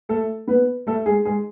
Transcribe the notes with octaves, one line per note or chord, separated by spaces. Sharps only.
A3 A4
B3 B4
A3 A4
G#3 G#4
G#3 G#4